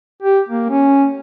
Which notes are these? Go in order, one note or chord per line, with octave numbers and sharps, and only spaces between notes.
G4
A#3
C#4